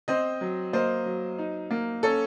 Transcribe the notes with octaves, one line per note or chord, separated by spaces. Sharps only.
C4 C5 D#5
F#3
A#3 C5 D#5
F#3
D#4
A#3
C#4 A4